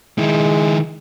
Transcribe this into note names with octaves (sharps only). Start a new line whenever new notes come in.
D#3 G#3 E4